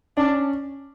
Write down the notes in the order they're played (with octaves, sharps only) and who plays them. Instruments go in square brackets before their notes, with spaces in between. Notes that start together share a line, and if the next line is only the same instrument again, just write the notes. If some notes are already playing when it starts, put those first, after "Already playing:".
[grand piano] C#4 [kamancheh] D4